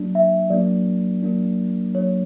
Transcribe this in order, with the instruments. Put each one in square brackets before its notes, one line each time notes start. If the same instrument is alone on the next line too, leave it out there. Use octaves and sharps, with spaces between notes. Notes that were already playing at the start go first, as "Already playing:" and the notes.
Already playing: [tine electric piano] F#3 A#3 D4
[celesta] E5
[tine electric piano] F#3 A#3 D4 [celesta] D5
[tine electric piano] F#3 A#3 D4
[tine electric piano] F#3 A#3 D4 [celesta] C#5